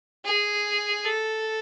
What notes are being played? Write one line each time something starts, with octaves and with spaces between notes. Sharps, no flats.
G#4
A4